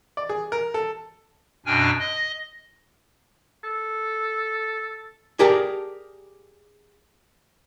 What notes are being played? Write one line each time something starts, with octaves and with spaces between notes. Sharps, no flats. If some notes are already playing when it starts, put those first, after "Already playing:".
D5
G#4
A#4
A4
F#2 B2 D4 G5 G#5 F6
D#5
A4
G4 G#4 A#4 D5 G5 A5